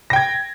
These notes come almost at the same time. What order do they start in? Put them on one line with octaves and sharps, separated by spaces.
A#6 G5 G#6